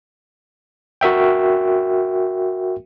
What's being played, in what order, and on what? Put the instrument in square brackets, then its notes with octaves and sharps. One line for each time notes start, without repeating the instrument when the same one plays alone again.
[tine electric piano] F#4 A#4 E5 G5